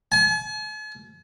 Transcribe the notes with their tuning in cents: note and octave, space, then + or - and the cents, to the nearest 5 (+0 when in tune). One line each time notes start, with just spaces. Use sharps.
G#5 +45